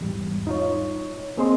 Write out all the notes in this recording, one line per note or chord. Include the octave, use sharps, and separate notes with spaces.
E2 G#2 G3
D#4 F4 C#5
A#3 C4 G#4 C5 D#5 C6